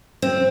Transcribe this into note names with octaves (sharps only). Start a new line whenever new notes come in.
C4